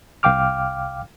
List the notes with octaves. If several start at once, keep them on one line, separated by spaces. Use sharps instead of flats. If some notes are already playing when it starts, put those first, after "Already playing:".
C2 F5 G5 D6 F6